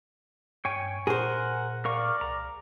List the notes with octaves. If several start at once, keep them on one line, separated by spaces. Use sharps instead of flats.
G2 C#5 G5 G#5
A#2 G#4 A#4 C5 F#5
A#4 D5 F5 C#6
C2 A#5